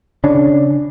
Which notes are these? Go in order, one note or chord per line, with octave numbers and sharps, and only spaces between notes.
C#3 C#4 D4